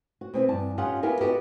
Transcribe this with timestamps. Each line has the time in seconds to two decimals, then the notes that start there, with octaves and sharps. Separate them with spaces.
0.21 F#4
0.33 B2 C4 E4
0.49 E2 G2 A5
0.78 C#4 D#4 F4 G4 F#5
1.03 B3 E4 F4 G4 G#4 A#4
1.21 B3 F#4 G4 A4 D#5